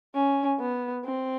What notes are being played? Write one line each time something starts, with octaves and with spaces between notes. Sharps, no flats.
C#4
B3
C4